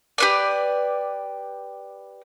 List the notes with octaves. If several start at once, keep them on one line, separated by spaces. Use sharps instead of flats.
G4 B4 D5